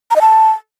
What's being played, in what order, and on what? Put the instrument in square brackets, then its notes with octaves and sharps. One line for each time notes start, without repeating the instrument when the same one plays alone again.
[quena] A#5
D#5
A5